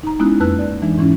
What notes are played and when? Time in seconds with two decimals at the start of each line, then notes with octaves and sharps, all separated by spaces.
0.03 D#4 A#5
0.19 G#3 B3 C#4 D#4 E4 F#6
0.40 F2 A#3 B4 A5 E6 F#6
0.59 D5
0.82 E3 G#3 D4 D#4
0.97 G#2 E3 C#4 E4